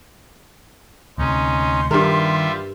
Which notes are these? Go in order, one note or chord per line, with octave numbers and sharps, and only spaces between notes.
D2 C3 C#4 D#4 C6
G2 D#3 G3 F4 A#4 E5